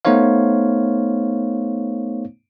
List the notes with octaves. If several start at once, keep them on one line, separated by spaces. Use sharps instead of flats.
A3 B3 D#4 C5 C#5 F5